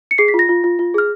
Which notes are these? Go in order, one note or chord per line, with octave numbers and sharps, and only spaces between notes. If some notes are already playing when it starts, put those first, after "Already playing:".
C#7
G#4 C7
B6
F4
A#6
F4
F4
F4
G#4 F6